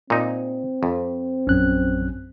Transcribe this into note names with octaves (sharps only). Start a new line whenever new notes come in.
A#2 C4 D#4
F2
A#1 F#2 C#4 F#6